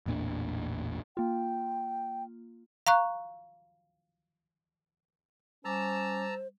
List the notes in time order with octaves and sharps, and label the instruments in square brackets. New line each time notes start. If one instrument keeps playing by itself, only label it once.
[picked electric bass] A1 E2 A#2 D4
[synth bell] A#3 F4 [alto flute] G5
[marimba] F5 A#5 C#6 F#6
[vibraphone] G3 D6 [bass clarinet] C#4 [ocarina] C5 [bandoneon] A5 A#5 E6